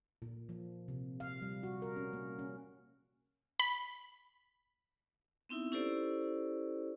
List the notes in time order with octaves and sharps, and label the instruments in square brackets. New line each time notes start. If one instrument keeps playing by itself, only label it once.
[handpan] A#2
F3
C3
F5
G3
F#4
A#4
C#4
A#3
C#4
[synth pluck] B5
[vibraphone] B3 C4 D#4 E4 E5
C#4 E4 G4 A4 C5 D5